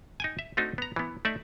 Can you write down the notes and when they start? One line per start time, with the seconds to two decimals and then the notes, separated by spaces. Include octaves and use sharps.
0.20 D#4 G5 G#5
0.39 E5
0.57 A3 C4 D4 D#4 F#4
0.78 B3 A#5
0.96 E3 B3
1.25 A3 D#4 D5 E5